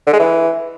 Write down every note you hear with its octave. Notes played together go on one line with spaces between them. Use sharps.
D3
G#3
E3